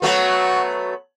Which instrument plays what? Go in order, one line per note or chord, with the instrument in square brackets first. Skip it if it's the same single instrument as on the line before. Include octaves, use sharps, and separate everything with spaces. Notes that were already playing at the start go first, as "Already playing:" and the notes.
[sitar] F#3 A3 B3 [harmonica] F#4